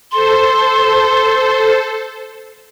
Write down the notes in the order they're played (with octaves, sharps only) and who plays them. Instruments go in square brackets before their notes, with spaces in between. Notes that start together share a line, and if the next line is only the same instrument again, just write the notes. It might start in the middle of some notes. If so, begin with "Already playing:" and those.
[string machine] A4 C5 [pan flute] C6